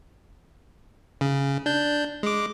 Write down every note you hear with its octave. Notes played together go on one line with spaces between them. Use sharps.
C#3
D4 G6
G#3 D6